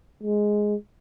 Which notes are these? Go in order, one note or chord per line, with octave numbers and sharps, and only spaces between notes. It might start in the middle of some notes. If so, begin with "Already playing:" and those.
G#3